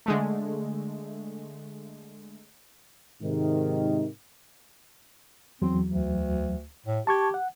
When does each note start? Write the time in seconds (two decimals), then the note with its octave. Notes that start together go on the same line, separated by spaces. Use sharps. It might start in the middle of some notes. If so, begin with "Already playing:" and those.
0.06 D3 G#3 A3
3.22 G#2 C3 D#3
5.62 E2 F#3 C4
5.89 D2
6.86 A2
7.07 G4 A5 C#6 G#6
7.34 F#5